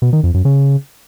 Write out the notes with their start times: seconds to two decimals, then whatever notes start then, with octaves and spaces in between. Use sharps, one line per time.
0.02 B2
0.13 D#3
0.23 F2
0.34 F#2
0.45 C#3